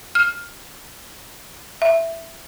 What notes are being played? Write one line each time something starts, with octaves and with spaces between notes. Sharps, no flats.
F6
E5